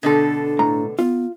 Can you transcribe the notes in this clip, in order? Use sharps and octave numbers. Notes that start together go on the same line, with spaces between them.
B2 D3 D4 A4
A2 A#5
B3 F4